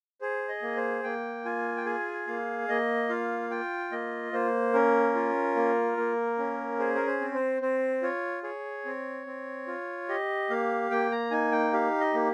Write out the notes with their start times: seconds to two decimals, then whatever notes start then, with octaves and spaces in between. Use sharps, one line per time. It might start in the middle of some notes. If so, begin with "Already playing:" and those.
0.21 G#4 C5
0.49 D#5
0.62 A#3
0.76 C5
1.04 A#3 G5
1.45 F4 G#5
1.77 G5
1.86 G#4 G#5
2.27 A#3 F5
2.69 A#3 D#5
3.09 F4 F5
3.50 F4 G5
3.92 A#3 D#5
4.32 A#3 C5
4.73 C#4 A#4
5.15 F4
5.56 A#3
5.97 A#3
6.38 C#4
6.79 G#4 C5
6.95 A#4
7.07 C5
7.21 C4
7.35 C5
7.61 C4 C5
8.02 F4 C#5
8.43 G#4 C#5
8.85 C4
9.27 C4
9.67 F4
10.09 G4 D#5
10.50 A#3 F5
10.91 A#3 G5
11.11 A#5
11.31 D#4 G#5
11.52 G5
11.73 G4 F5
12.00 D#5
12.14 A#3